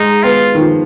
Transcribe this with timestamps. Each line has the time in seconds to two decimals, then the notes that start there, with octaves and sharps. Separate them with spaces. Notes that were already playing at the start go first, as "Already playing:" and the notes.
Already playing: G#3 D#4
0.23 B3 F4
0.55 D#3
0.60 F3